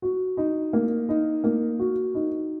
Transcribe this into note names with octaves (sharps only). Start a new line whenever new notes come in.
F#4
D#4
A#3
D#4
A#3
F#4
D#4